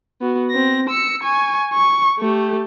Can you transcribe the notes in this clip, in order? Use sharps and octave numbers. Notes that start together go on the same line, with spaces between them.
B3 F#4
C4 A#6
E6 C#7
G#5 C#6
C#6
A3 G4